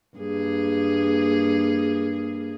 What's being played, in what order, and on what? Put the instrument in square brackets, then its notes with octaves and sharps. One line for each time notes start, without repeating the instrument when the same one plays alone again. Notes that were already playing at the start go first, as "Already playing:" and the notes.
[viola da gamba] G2 A#3 G#4